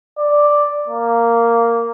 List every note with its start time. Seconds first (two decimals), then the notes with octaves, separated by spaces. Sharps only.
0.18 D5
0.88 A#3